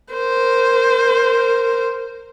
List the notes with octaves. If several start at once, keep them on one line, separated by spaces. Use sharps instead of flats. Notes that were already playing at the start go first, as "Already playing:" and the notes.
A#4 C5